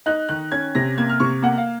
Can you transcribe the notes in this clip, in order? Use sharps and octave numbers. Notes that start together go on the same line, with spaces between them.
D#4 F#6
D#3 F#6
C#4 G#6
C3 A#6
A#3 G#6
F6
C3 C#6
A#3 F#5
F5